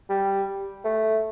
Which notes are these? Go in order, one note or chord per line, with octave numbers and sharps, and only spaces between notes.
G3
A3